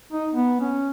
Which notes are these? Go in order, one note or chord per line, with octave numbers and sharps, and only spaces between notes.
D#4
B3
C#4